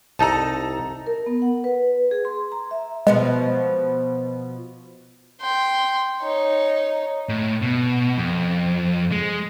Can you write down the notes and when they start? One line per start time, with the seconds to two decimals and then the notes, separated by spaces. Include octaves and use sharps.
0.19 C2 D#4 A4 A5 A#5
1.07 A#4
1.26 B3
1.42 F#5
1.64 B4
2.11 G#4
2.25 C6
2.52 A#5
2.71 E5
3.07 B2 F3 G#3 B3
5.41 G5 C6
6.22 D#4 C#5
7.29 A2
7.62 B2
8.18 F2
9.12 G#3